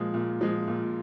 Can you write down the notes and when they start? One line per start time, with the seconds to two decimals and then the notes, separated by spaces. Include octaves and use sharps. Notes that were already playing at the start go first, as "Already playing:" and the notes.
Already playing: A#2 F3 G#3
0.14 A#2
0.41 F3 G#3
0.67 A#2